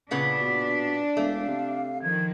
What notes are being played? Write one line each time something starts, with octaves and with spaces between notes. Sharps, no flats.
A#2 C#3 B3 D4 B6
B2
E1 A3 F5
C3
D#3 F3 G#6